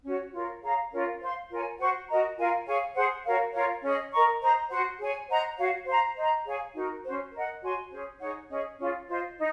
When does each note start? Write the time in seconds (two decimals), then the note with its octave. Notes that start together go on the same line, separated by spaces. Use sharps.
0.03 C#4 F#4 C#5
0.32 F4 A#4 C#5
0.62 G#4 C#5 F5 A#5
0.92 C#4 F4 A#4
1.20 C5 F5 C6
1.50 F4 A#4 C#5 G#5
1.79 F#4 C5 F#5 C#6
2.08 F#4 A#4 D#5 A#5
2.38 F4 A#4 F5 G#5
2.66 G#4 C#5 F5 G#5
2.95 G#4 C5 F#5
3.24 F#4 A#4 C#5 F5
3.53 F4 A#4 C#5 F5
3.82 C#4 G#4 D#5
4.11 A#4 D#5 A#5 C#6
4.41 C5 D#5 A#5
4.71 F#4 C5 F#5
5.00 G#4 C#5 G#5
5.28 C5 D#5 F#5 A#5
5.57 F#4 C#5 F5
5.86 C5 F5 A#5
6.16 C5 D#5 A#5
6.46 G#4 C#5 F5 G#5
6.74 D#4 F#4 A#4
7.04 C#4 F#4 C5
7.33 A#4 D#5 F#5
7.62 F#4 C#5 G#5 C6
7.91 C#4 G#4 C5
8.19 D#4 G#4 C#5 F#5
8.49 C#4 G#4 D#5
8.78 C#4 F4 G#4
9.08 F4 C5 D#5
9.37 D#4